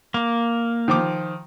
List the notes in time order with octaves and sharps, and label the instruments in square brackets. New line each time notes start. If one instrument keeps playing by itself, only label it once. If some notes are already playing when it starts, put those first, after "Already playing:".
[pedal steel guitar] A#3
[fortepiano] D#3 F3 D6